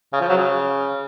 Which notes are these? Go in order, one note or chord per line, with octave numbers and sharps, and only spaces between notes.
C#3
F3
F#3
C#3